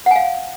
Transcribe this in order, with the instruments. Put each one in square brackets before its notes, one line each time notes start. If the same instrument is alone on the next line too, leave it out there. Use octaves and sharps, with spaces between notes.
[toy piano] F#5
G#5
F5